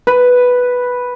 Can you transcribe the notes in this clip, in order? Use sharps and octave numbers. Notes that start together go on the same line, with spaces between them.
B4